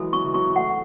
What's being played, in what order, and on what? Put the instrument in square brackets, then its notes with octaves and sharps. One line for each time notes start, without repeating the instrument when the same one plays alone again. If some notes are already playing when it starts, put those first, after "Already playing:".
Already playing: [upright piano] E3 F#3 G#3 [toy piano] A4
[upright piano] F#3 [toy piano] C#6
[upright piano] E3
[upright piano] F#3 [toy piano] C#6
[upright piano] A3 [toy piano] F#5